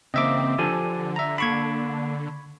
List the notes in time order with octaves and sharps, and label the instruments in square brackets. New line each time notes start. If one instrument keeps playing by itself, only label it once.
[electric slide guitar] C#3 E3 A#3 [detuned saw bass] C4 [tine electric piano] D#5 E5 D6
[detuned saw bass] D3 [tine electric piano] F3 [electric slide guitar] G4 A4 G#5
[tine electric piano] E5 A#5
[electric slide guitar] A#3 D4 [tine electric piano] B5 C#6 G#6